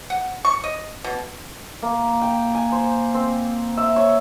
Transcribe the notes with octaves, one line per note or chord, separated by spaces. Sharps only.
F#5
C#6
D#5
B2
A#3
G5
G#5
C5
C4
E5
C#5